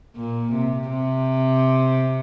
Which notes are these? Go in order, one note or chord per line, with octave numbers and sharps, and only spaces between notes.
A#2
C3
C3